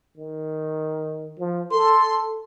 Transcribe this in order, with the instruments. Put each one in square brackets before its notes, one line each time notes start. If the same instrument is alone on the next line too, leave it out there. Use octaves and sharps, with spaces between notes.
[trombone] D#3
F3
[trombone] A4 [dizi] C6